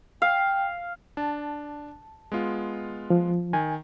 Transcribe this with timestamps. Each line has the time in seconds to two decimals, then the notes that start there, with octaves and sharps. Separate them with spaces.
0.22 F5 G5
1.17 D4 A5
2.32 G#3 B3 F4
3.10 F3
3.53 D#3 G#5